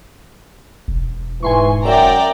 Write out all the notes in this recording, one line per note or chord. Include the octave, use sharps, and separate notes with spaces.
E1
G#2 E3 G#5 C6 C#6
F#2 D5 E5 G5 A#5